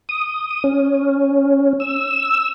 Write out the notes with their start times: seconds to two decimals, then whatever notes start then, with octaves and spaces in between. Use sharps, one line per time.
0.09 D#6
0.64 C#4
1.80 E6